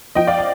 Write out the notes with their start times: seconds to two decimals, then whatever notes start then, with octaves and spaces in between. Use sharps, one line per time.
0.15 F3 D#5 G5
0.27 D5 F5
0.38 G5